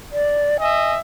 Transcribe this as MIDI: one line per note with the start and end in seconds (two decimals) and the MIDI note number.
0.13 0.58 74
0.60 0.98 75
0.60 0.98 76
0.60 0.92 80